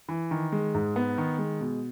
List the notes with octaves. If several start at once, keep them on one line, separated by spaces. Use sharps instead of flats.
E3
D#3
G#3
G#2
B3
D#3
G#3
B2